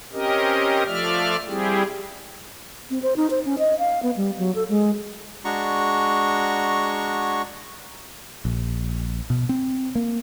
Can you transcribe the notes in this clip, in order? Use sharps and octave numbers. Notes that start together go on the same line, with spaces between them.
C4 C#4 G4 A#4 D#5
F3 A3 F4 D5 E5 F6
G3 C4 E4 G4 G#4
C4
C5
D#4
C5
C#4
D#5
F5
B3
G3
F#3
A4
G#3
G#3 D4 F#4 A#5 C#6
A#1
B2
C4
A#3